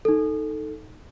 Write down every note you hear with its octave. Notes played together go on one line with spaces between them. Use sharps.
D#4 A4